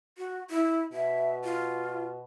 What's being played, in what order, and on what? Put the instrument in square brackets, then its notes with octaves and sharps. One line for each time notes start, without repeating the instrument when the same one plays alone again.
[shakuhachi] F#4
E4
[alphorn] B2 [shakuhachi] E5
[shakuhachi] F4